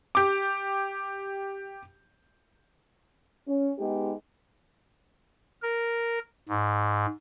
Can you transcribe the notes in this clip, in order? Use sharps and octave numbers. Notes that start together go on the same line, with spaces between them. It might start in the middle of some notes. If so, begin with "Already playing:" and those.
G4 D6
C#4
G#3 B3 D#4 G4
A#4
G#2